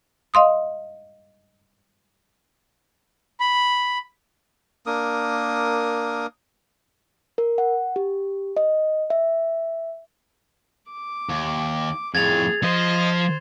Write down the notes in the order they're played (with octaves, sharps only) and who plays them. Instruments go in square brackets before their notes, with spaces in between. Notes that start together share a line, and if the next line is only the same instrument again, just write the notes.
[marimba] D#5 F5 C6 D#6
[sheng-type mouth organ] B5
[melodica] A#3 D4 A#4 D#6
[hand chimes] A#4
F#5
G4
D#5
E5
[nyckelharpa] D6
[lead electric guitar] D#2
[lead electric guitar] F2 A2 [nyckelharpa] G#4 [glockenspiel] G#6 A6 F7
[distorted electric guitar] F3 [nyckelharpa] C5 [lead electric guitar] D#5